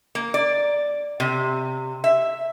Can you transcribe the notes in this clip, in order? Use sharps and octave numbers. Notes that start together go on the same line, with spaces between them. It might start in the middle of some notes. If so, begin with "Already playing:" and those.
A#3
D5
C3
E5